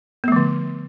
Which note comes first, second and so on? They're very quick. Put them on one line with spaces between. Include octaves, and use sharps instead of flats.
B3 A3 F3 D3